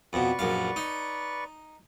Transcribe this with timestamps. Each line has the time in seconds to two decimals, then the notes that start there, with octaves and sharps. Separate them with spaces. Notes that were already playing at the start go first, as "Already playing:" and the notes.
0.13 F2 B2 B4 D5 C#6
0.39 A#1 F#2 F5
0.76 D#4